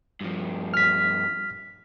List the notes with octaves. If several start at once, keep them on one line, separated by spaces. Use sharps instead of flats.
G2 F3
F6 B6